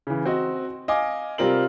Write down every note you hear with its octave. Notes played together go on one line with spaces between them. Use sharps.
C#3 E3
C4 F#4 D#5
D#5 F5 G#5 D6
C3 G3 C4 F4 A#4 F#7